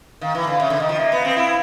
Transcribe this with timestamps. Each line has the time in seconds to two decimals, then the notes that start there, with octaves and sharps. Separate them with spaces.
0.21 D#3 F5
0.35 E3
0.47 D3
0.60 C#3 E5
0.70 D3
0.80 D#3 D#5
0.89 F3
0.99 A#3 E5
1.12 B3
1.17 F5
1.25 C4
1.37 E4 F5